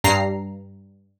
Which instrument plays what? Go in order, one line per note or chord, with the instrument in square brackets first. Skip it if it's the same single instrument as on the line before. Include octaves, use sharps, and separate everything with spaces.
[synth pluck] G2 A#5 C7